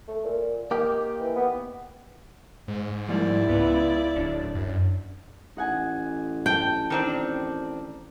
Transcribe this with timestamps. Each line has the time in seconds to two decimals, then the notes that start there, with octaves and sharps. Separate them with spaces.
0.08 A3
0.24 A#2
0.71 D#3 A#3 D#4 G4
1.20 E3
1.36 B3
2.68 G#2
3.09 F3 G3 A#3 E4 D5
3.49 C#2 B3 F4
4.16 D1 C#4 D4
4.55 F#2
5.57 A1 D#4 F#5 G#5
6.46 G5 A5
6.90 D#3 C4 D4